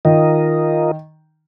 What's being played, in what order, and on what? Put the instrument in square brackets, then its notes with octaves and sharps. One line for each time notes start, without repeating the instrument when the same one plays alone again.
[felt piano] D#3 [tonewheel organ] F4 A#4 D#5